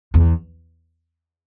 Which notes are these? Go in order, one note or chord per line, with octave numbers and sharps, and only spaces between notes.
E2